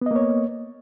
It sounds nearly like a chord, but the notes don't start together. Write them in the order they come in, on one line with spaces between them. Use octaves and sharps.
B3 D#5 A#3 C#5